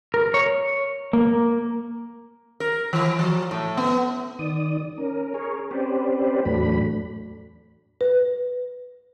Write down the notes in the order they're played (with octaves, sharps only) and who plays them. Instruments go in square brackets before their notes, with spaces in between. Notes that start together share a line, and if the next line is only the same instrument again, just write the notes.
[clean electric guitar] A#4
C#5
A#3
[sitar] A#4
E3
F3
A2
B3
[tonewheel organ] D#3 D5 D#6
C#4 A#4
G#4 A#4 C#5
C4 C#4 G4 B4 C5 D5
E2 A2 F#3 A3 D4 B5
[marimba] B4